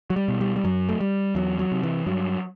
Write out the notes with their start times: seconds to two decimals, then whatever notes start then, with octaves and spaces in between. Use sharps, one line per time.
0.10 F#3
0.16 G3
0.28 B2
0.41 G3
0.56 G3
0.64 F#2 F#3
0.89 A3
1.01 G3
1.35 E2 F#3
1.59 F#3
1.72 C3
1.83 E3
2.07 G2 F#3